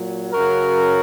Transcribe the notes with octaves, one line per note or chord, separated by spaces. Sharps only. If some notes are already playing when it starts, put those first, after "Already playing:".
Already playing: A#2 F#3
F#2 C#3 F#3 F#4 A#4